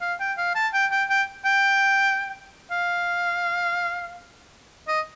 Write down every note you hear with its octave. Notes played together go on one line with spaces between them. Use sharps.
F5
G5
F5
A5
G5
G5
G5
G5
F5
D#5